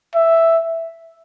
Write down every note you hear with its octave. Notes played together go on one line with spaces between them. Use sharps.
E5